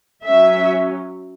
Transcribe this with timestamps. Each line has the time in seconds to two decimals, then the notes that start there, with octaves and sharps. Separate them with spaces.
0.24 F#3 C#4 E5